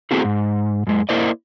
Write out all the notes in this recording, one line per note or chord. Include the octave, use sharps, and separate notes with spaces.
A3 B3 C4 E4 F#4 G#4
G#2
F#2 G#3
A#3 E4 A#4 C5 D5 D#5